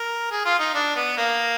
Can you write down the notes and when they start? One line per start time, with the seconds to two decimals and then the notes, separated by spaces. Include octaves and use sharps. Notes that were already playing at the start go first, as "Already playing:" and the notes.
Already playing: A#4
0.31 G#4
0.46 F4
0.59 D#4
0.74 D4
0.96 B3
1.18 A#3